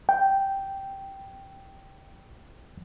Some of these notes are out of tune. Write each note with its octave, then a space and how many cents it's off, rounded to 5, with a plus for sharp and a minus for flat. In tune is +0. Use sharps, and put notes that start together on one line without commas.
G5 -5